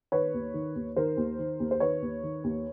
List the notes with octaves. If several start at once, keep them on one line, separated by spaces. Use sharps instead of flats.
D#3 B4 C#5
D#2
D#3
D#2
D#3 A#4 C5
D#2
D#3
D#2
C5
D#3 B4 C#5
D#2
D#3
D#2